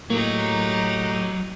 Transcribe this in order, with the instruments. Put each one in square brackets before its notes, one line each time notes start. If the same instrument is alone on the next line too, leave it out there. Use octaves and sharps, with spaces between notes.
[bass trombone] A2 [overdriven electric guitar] F#3 [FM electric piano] A#3 [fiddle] D#4 G4